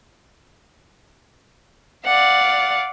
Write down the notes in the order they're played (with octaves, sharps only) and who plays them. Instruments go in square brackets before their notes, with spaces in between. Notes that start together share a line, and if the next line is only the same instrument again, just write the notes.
[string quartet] D5 F5 F#5